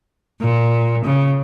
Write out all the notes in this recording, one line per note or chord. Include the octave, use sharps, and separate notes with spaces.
A#2
C#3